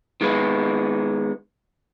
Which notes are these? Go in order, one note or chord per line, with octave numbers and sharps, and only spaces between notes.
D#3 G#3 B3 B4